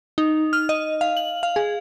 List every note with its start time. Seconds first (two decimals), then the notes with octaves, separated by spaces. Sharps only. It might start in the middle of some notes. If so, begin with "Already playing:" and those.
0.18 D#4
0.53 F6
0.69 D#5
1.01 F5
1.17 F#7
1.43 F5
1.56 G#4